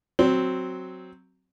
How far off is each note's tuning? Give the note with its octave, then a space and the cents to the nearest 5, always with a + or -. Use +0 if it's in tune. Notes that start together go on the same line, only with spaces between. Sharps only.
F#3 +0 C4 +0